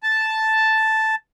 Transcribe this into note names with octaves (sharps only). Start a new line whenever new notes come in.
A5